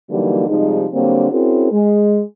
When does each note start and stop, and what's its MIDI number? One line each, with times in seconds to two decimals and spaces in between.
0.10 0.47 50
0.10 0.47 52
0.10 0.47 54
0.10 0.47 55
0.10 0.47 58
0.10 0.47 63
0.48 0.85 48
0.48 0.85 53
0.48 0.85 55
0.48 0.85 56
0.48 0.85 63
0.93 1.31 50
0.93 1.31 54
0.93 1.31 55
0.93 1.31 58
0.93 1.31 60
0.93 1.31 62
1.32 1.70 60
1.32 1.70 61
1.32 1.70 64
1.32 1.70 66
1.32 1.70 68
1.32 1.70 70
1.72 2.20 56